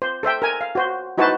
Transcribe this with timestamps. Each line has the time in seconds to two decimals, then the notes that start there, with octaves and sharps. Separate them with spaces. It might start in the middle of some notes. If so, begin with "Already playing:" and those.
0.02 C5
0.23 A4 C5 E5 G5
0.42 A#4 G#5
0.61 F5
0.75 F#4 C5
1.18 D#4 E4 F#4 B4 C5 A5